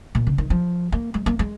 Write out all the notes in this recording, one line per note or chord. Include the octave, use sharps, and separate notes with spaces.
A#2
C#3
D#3
F3
A#3
G#3
A#3
G#3